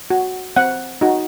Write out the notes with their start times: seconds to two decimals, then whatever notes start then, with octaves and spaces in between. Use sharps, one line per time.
0.10 F#4
0.56 C4 F#5
1.01 D#4 F#4